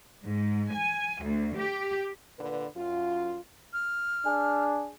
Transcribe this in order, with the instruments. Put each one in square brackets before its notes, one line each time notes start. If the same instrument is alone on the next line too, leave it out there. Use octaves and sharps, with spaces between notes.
[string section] G#2
G#5
D2
G4
[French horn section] A#2 D3 B4
F#2 F4
[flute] F6
[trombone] D4 [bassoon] G#4